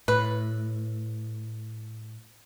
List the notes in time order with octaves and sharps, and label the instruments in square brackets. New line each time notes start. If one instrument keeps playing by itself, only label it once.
[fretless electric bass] A2 [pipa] B4